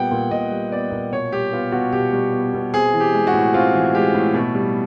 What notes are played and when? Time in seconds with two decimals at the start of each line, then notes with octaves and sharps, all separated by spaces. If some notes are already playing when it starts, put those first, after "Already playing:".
Already playing: A#2 G3 B3 F#5 G5
0.11 A#2
0.31 A#2 D#5
0.51 G3
0.72 B3 D5
0.91 A#2
1.12 B2 C#5
1.32 G3 G4
1.52 B3 F4
1.72 B2 F#4
1.92 B2 G4
2.13 G3
2.33 B3
2.54 B2
2.74 C4 G#4
2.93 E3
3.00 G4
3.13 G#3
3.27 F#4
3.33 A2
3.54 C4 F4
3.74 E3
3.95 G#3 G4
4.14 A2
4.34 B2
4.55 G3